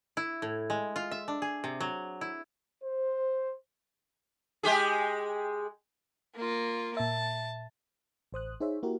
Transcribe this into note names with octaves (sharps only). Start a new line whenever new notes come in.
E4
A2
G#3
F4
E5
D4
G#4
C3
F#3
E4
C5
G#3 G4 G#4
A#3 F4
A#2 E5 A5
A1 C5 D#6 F#6
D#4 G#4 C5 C#5 E5
A#3 E4 F#4 G4 A#4